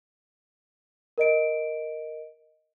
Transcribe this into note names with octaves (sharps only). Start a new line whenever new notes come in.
A#4 D#5 D7